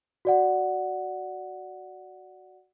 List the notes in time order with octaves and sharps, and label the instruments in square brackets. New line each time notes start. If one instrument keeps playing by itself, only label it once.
[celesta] F#4 D5 F#5